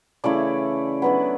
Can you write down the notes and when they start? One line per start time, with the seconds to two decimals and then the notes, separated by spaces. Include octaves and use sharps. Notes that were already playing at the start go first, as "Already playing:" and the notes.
0.24 C#3 E3 A3 E4 D5
1.02 F#3 B3 D4 B4